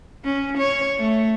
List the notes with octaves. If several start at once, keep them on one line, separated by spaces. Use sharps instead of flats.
C#4
C#5
A3